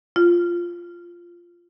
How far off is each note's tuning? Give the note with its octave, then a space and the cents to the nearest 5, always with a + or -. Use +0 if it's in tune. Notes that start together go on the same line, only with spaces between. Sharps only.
F4 -5